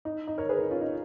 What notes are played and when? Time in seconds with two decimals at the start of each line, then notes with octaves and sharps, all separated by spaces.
0.05 D#4
0.28 D#4
0.38 A#4 C#5
0.49 G#4 B4
0.60 D#4
0.71 C#4 F4
0.81 D#4